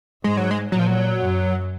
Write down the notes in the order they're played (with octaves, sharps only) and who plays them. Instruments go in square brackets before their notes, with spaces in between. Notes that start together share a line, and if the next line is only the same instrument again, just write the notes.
[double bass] G#2 [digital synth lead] G#3
[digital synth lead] F#3
G#3
[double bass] A#2 [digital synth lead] F#3
[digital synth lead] F3
F#3
[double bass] F#2